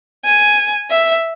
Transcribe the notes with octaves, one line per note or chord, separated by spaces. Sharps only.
G#5
E5